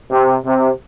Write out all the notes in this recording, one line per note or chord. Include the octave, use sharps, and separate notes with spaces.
C3
C3